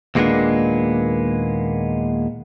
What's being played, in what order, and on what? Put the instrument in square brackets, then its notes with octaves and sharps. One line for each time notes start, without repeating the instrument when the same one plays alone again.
[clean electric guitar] D#2 A#2 G#3 A#3 B3 D4